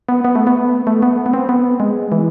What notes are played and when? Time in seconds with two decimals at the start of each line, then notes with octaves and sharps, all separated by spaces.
0.09 B3
0.25 B3
0.35 A3
0.47 B3
0.87 A3
1.03 B3
1.26 B3
1.34 C4
1.49 B3
1.80 G#3
2.12 E3